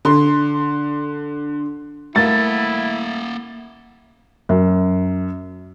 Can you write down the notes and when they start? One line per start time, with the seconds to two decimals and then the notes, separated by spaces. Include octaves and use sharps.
0.05 D3 C6
2.16 A3 A#3 E4 A#4 F5 F#5 A6
4.49 F#2